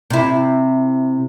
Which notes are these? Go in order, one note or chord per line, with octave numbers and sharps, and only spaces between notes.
C3 E4